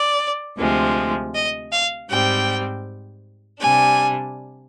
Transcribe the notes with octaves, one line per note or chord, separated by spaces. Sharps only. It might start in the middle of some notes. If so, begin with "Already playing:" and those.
Already playing: D5
D2 C3 F3 G#3
D#5
F5
G#2 G3 C4 G5
C3 G3 D4 G#5